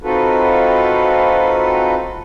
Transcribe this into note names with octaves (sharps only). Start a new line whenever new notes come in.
C4 D#4 F4 F#4 A4 B4